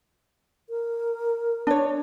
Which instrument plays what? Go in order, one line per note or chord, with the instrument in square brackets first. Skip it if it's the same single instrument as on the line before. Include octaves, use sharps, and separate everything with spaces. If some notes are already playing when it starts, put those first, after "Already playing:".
[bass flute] A#4
[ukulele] D4 C#5